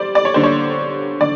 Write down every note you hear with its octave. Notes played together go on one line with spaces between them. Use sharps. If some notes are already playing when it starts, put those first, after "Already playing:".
Already playing: G3 C5 D5
D5
C#5
D3 G3 A#3 C5
C#5
D3 D5